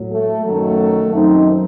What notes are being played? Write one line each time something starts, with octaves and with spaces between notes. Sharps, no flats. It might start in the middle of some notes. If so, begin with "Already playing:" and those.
Already playing: A2 F#3
A3
F#2 D#3 F#3 A3
F#2 D#3 F#3 C4 D#4